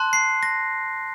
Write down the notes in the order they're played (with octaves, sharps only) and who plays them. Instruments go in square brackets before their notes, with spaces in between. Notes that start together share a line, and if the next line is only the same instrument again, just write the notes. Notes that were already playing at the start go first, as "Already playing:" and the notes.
Already playing: [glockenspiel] A5 C6 F#6
C7
A#6